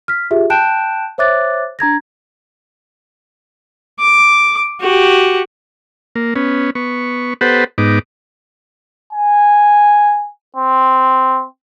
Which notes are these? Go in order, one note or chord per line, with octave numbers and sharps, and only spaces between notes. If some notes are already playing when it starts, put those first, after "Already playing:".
F6 B6
F4 G4 G#4 E5
G5 A5 F#6 G6 D7 E7
C5 C#5 E5 D6 F#6 A6
D4 A#5 G#6 A#6
D6
F#4 G4
A#3
B3 C#4
B3 C#6
B3 G4 A4 B4 C5 F#5
G#2 B3 D#4 D6
G#5
C4